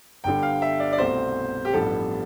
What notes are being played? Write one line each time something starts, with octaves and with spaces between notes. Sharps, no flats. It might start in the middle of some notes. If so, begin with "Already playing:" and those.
G1 G2 D3 G5
F5
E5
D5
D5
C2 B2 A3 C4 C5
G4
A1 G2 F3 B3 A4